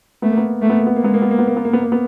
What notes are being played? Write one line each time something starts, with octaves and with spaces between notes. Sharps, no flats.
A3 B3
A#3
B3
A3 A#3
B3
A#3
B3
A#3
G#3 B3
A#3
B3
A#3
B3
A#3
B3
A#3
B3
A#3
B3